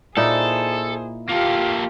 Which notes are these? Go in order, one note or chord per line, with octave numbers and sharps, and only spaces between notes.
A#2 D#4 E4 G#4 A4 C5
A#3 F4 G4 A4